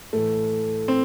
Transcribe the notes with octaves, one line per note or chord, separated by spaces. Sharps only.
A2 E3 A3
C4